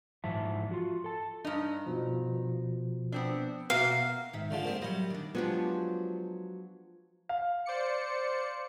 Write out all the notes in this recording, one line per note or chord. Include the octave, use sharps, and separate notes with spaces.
G#2 E3 F3 E5 A5
F4 F#4
A4 A5
G2 D4 D#4
B2 F3
B3 C4 D4
B2 A#3 B3 F#4 E5 F5
G#2 D#3 E5
D3 F3 G#3
F3 A#3 C4 G4 C5
F#3 G3 D#5
D#3 D4
F3 F#3 G#3 B3 D4 G4
F5
C5 D5 C#7